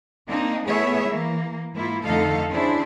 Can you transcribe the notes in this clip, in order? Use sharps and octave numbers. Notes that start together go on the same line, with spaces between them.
A#3 C4 D4 D#4
A3 B3 E4 G#4 C#5 E5
E3 A#3
G#2 A#3 E4 F4
F2 D3 A3 D#4 A4 F5
C#4 D4 E4 G#4 C5